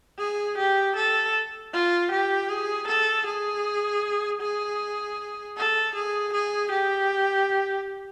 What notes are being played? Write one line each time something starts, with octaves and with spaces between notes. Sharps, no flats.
G#4
G4
A4
F4
G4
G#4
A4
G#4
G#4
A4
G#4
G#4
G4